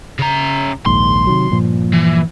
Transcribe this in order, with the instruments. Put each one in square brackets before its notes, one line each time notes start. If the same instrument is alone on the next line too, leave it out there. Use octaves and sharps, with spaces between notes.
[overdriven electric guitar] C#3 A#5
[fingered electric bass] A#1 D#2 G#2 [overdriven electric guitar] C6
[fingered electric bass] C3 D#3 F#3
G2 A#2 F3
[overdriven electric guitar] E3